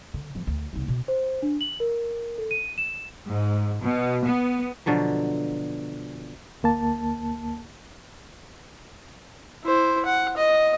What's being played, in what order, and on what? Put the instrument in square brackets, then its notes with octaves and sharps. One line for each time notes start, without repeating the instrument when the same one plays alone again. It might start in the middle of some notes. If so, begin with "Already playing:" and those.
[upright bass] D3
F2 F3
D2
C2 D#4
B2
[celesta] C5
D4
F#7
A#4
A4
D#7
E7
[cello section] G#2
B2
B3
[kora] B2 D3 F3 F#3
[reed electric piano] D2 A#3 A5
[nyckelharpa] E4 C5
F#5
D#5